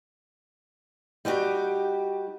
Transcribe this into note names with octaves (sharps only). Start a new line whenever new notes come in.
G3 D#4 F#4 G4